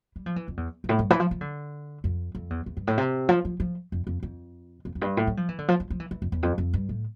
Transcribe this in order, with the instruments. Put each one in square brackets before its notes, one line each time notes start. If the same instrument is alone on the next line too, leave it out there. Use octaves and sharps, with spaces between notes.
[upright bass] G3
F3
E3
F2
E2
G2
A2
G2
E3
F3
F3
D3
F2
F2
E2
E2
G2
A2
C3
F3
F3
F3
F2
F2
F2
F2
F2
G2
A2
G3
F3
E3
D3
F3
F3
F3
E3
E3
F2
E2
F2
F2
G2
A2